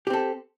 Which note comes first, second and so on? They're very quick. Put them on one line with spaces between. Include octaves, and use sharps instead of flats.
G4 C4 A4